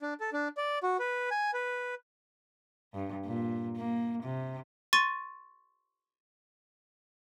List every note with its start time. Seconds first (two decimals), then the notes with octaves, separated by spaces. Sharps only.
0.01 D4
0.20 A4
0.33 D4
0.57 D5
0.83 F#4
0.99 B4
1.31 G#5
1.54 B4
2.93 G2
3.25 A#2
3.77 A#3
4.23 C3
4.93 C6 C#6 A6 D#7